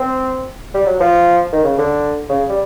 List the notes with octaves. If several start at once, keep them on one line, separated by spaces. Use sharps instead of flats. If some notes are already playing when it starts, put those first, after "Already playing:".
Already playing: C4
G3
F#3
F3
D#3
C#3
D3
C#3
G3